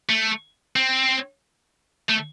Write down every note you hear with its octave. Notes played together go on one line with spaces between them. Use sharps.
A3
C4
A3